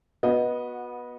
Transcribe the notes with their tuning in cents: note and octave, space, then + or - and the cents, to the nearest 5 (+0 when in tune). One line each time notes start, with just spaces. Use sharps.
B3 -15 F#4 -25 D#5 +0